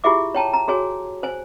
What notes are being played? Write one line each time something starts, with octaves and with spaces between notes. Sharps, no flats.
E4 F4 G4 G#4 E5 D6
C#5 G5 A5 A#5
A#5
F#4 G#4 C#5 G#5
C5 G#5